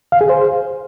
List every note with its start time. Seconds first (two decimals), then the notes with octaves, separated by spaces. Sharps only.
0.12 F5
0.21 G#4
0.29 C5